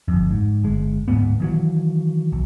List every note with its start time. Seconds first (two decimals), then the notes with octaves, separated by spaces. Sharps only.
0.08 G1 F2
0.31 G#2
0.64 G1 G#3
1.08 D1 F2 G#2 B3
1.40 D#3 E3 F#3
2.32 B1